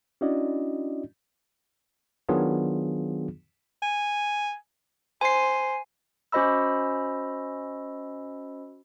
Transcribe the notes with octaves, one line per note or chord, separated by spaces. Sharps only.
C#4 D4 E4 F#4 D5 D#5
D#3 F#3 B3 D4 F4 G#4
G#5
C5 G#5 C7
C#4 F#4 C5 D#5 B5 E6